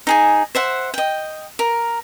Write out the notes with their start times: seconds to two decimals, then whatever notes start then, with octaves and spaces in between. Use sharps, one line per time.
0.07 D#4 G#4 G#5
0.55 C5 E5 F#5
0.94 D#5 G5
1.59 A#4